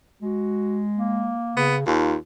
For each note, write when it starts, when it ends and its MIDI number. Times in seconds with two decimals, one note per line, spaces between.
0.22 1.34 56
0.22 0.81 66
0.96 1.72 58
1.57 1.86 49
1.57 1.76 59
1.87 2.15 39
1.87 2.17 63
1.87 2.17 65